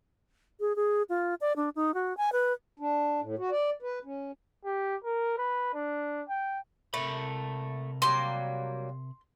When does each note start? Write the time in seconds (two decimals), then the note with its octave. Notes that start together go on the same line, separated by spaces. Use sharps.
0.60 G#4
0.76 G#4
1.09 F4
1.41 D5
1.56 D4
1.75 D#4
1.94 F#4
2.17 G#5
2.32 B4
2.80 D4
3.21 A2
3.38 F#4
3.51 D5
3.82 B4
4.05 C#4
4.65 G4
5.04 A#4
5.38 B4
5.74 D4
6.29 G5
6.94 C3 A3 A#4 B5
8.02 F#3 G3 A#3 C6